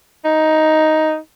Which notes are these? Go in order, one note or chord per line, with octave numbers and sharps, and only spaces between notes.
D#4